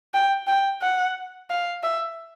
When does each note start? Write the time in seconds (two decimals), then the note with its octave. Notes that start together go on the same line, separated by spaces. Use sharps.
0.14 G5
0.47 G5
0.82 F#5
1.50 F5
1.83 E5